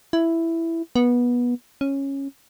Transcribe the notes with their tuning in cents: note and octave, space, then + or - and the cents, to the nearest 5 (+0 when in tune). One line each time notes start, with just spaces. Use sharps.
E4 +5
B3 -20
C#4 -10